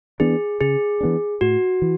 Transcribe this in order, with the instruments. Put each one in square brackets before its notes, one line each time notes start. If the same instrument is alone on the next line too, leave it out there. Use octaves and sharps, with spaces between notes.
[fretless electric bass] E3 B3 D4 [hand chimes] G#4
[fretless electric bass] C#3 [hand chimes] G#4
[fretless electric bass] E3 B3 D4
[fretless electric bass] A2 [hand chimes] F#4
[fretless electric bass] E3